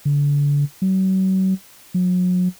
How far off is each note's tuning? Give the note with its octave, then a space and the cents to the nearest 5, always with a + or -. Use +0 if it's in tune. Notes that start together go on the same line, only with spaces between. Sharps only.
D3 -35
F#3 +40
F#3 -35